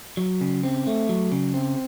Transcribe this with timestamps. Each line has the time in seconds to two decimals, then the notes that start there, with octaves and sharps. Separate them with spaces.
0.17 F#3
0.41 C#3
0.63 C4
0.87 A3
1.09 F#3
1.32 C#3
1.54 C4